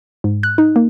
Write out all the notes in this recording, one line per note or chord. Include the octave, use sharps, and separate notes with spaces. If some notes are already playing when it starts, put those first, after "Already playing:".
G#2
F#6
D#4
A#3